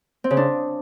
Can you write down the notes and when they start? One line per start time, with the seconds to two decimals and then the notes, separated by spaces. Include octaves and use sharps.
0.24 C4
0.31 C#3
0.37 D4